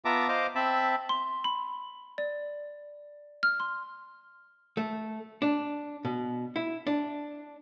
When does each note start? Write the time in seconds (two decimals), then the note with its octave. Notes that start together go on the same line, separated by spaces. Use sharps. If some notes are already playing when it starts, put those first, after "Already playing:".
0.05 B3 F4 E5 A5 A#5 D6
0.28 C5 D#5 F5 D6
0.55 C4 E5 A5 B5
1.09 C6
1.44 B5
2.18 D5
3.43 F6
3.60 C6
4.77 A3
5.42 D4
6.05 B2
6.56 E4
6.87 D4